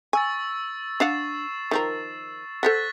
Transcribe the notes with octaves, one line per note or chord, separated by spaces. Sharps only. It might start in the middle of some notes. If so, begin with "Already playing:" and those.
G#5 C#6 E6 A6
D4 F5 F#5 A6 C7 E7
D#3 F3 A#4
A4 C5 F#5 F#6 A6 B6